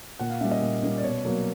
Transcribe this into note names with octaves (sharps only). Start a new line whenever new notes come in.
A#2 F#5
F5
G3 A#3 C#4 E5
D#5
A#2
G3 A#3 C#4
D5
B2 C#5
F#3 A#3